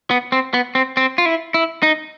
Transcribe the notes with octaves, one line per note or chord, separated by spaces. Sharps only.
B3
C4
B3
C4
C4
F4
E4
E4
D#4